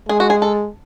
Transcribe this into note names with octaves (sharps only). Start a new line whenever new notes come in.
G#3 G#4
F#4
G#4
A4